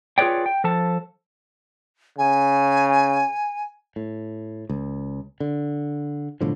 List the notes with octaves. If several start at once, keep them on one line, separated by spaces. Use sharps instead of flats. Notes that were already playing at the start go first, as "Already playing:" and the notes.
F4 G#4 B4 C#5 D5 G5
G5
F3 A4 A5
C#3 G#5
A2
C#2
D3
B1 A2 D3 F3